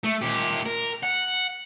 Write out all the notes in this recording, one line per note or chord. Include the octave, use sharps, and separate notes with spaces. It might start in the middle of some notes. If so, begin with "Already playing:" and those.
A3
A#2 G4
A#4
F#5